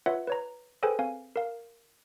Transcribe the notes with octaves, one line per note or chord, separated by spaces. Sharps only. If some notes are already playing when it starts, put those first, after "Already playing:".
F4 B4 C#5 E5 F#5
B4 C#5 A#5
G#4 A4 B4 C5 G5 G#5
C4 F5 G#5
A#4 F5